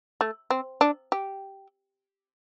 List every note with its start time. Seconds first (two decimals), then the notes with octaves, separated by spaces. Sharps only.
0.21 A3
0.50 C4
0.81 D4
1.12 G4